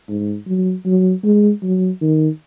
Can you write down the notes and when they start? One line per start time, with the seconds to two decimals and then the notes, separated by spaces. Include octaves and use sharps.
0.09 G#2
0.47 F#3
0.86 F#3
1.24 G#3
1.63 F#3
2.02 D#3